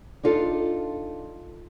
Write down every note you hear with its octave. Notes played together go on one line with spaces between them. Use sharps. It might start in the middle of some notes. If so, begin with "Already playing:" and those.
D4 D#4 F4 A4